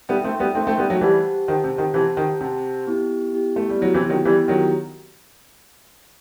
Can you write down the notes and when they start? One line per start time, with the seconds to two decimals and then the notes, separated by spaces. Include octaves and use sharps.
0.09 G3 B3 D#4 A4 E5 G5
0.24 A3 C4
0.40 G3 B3
0.55 A3 C4 D#4 A4 E5 G5
0.67 A3 C4
0.78 G3 B3
0.90 F#3 A3
1.01 E3 G3 G4 C5 F#5 A5
1.47 D#3 G4 C5 F#5 A5
1.64 C3
1.78 D#3
1.94 C3 E3 G4 C5 F#5 A5
2.17 D#3
2.41 C3 G4 C5 F#5 A5
2.87 B3 E4 G4
3.32 B3 E4 G4
3.56 A3
3.69 G3
3.79 F#3 B3 E4 G4
3.94 C3 E3
4.09 D#3 F#3
4.25 E3 G3 B3 E4 G4
4.48 D#3 F#3